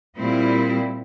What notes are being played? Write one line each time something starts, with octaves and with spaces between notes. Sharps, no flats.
A#2 G3 C4 E4